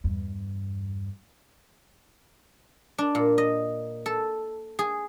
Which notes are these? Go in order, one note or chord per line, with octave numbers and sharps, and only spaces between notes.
E2 G2
D4
A#2
D#5
A4
G#4